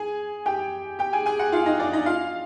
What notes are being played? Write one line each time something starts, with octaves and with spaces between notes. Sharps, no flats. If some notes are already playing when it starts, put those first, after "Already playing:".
Already playing: G#4 G#5
G4 G5
G4 G5
G#4 G#5
G#4 G#5
F#4 F#5
F4 F5
D#4 D#5
D4 D5
D#4 D#5
F4 F5